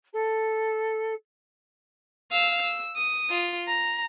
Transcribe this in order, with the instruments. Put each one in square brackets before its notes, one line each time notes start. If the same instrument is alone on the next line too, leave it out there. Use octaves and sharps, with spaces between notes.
[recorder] A4
[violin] F5 E6
E6
D#6
F4
A#5